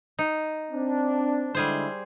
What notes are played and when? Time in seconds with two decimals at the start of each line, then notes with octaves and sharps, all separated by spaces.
0.19 D#4
0.71 C4 D4
1.55 D3 G3 G#3 E4 G#4 C5